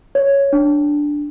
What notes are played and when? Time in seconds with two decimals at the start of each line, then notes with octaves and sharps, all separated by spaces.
0.15 C#5
0.53 D4